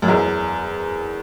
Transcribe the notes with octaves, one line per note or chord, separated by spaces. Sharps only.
F#2
E2